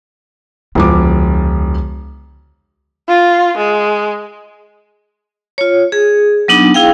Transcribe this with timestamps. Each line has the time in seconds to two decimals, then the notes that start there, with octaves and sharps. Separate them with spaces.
0.75 E1 C#2 D3 F3 D6
3.09 F4
3.57 G#3
5.58 F4 C#5
5.92 G#4
6.48 F#3 B3 D4 D#4
6.74 E4 G#4 F5 G5